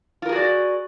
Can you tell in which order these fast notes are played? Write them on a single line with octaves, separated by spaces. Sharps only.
F4 A#4 G#4 F#4 D5